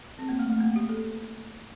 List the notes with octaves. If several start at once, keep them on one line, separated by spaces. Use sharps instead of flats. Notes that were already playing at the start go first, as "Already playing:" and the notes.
C4
A#3
A3
A3
A#3
G4
A4